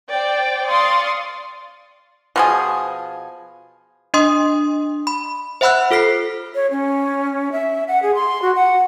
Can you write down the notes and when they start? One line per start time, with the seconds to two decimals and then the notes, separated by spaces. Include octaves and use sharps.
0.10 C5 D5 G5
0.68 D5 F5 C6 C#6 D#6
2.36 B2 F3 G#4
4.14 D4 D#5 C6 D#6
5.07 B5
5.61 C5 E5 F#5 B5 E6 F#6
5.91 F4 A4 F6 B6 C7
6.55 C#5
6.71 C#4
7.52 E5
7.88 F#5
8.02 G#4
8.15 C6
8.42 F#4
8.55 F#5